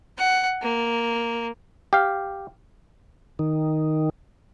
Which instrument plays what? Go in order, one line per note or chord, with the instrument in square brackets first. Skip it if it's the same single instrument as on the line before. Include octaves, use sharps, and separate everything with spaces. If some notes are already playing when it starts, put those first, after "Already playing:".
[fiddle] F#5
A#3
[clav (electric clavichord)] G4 F5
[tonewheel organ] D#3